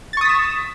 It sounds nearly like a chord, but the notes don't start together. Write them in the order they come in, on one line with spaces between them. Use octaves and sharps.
A6 C#6 D#6 B6 E7